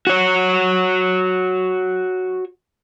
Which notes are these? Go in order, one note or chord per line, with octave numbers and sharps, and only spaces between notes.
F#4 C#5